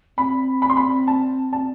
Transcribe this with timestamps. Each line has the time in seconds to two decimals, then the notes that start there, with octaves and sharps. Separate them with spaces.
0.17 C4 B5
0.62 B5
0.70 C6
0.77 B5
1.07 A5
1.53 A5